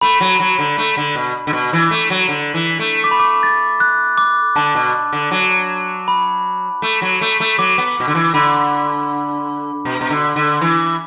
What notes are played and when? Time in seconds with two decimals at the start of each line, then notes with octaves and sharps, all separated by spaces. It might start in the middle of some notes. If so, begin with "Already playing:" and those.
0.01 A3 B5
0.20 F#3
0.40 F#3
0.59 D3
0.78 A3
0.97 D3
1.15 B2
1.47 D3
1.53 B2
1.73 E3
1.91 A3
2.10 F#3
2.29 D3
2.54 E3
2.79 A3
3.04 D6
3.11 B5
3.20 D6
3.43 A6
3.80 F#6
4.18 D6
4.56 D3 A5
4.75 B2
5.13 D3
5.31 F#3
6.08 B5
6.82 A3
7.02 F#3
7.21 A3
7.40 A3
7.58 F#3 D6
7.78 B3
8.00 B2
8.08 D3
8.15 E3
8.34 D3 B5
9.85 B2
10.01 B2
10.10 D3
10.36 D3
10.61 E3